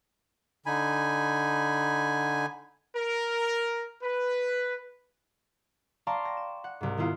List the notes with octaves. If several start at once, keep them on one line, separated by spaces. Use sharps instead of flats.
D3 D#4 G#5 B5
A#4
B4
D5 F5 A5 A#5 C6 C#6
G5 A#6
E7
F#5
C2 G#2
D#3 B3 E4 F4 G#4